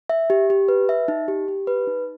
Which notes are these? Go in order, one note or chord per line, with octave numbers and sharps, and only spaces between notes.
E5
G4
G4
B4
E5
D#4
G4
G4
B4
D#4